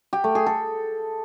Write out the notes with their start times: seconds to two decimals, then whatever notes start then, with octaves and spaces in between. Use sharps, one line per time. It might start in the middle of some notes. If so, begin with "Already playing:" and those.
0.13 G4
0.24 A3
0.35 G#4
0.46 A4